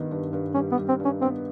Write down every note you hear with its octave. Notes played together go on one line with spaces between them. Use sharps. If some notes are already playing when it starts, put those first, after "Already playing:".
Already playing: G2 D#3 B3
G2
G2
G3 C#4
B3
G3
C4
G2
C#4
B3 C4